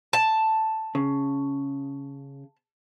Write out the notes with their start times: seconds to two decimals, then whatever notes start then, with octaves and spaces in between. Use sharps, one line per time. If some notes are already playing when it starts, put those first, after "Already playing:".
0.13 A5
0.95 C#3